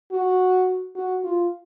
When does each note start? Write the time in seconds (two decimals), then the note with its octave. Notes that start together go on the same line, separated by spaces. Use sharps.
0.12 F#4
0.96 F#4
1.24 F4